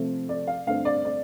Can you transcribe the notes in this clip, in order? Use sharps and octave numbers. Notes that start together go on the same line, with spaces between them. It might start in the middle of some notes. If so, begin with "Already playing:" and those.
Already playing: C3 F3 A3 C4
D5
F5
G2 D3 A3 C4 F5
D5
D5